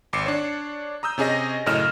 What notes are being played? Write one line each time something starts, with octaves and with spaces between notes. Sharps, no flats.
G#1 D6 C7 C#7 E7
D4 C#5
A#5 D#6 E6 G6
C3 C#4 G#4 D#5 A#6
F#2 A2 C#3 D#5 F6 E7